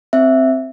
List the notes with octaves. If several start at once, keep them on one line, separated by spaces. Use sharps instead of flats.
C4 E5